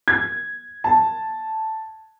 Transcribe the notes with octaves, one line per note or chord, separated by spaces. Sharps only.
G#6
A5